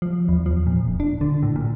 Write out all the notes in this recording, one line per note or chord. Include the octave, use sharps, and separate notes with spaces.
F3
E2
F3
A#2
D1
D4
D3
A2
A#2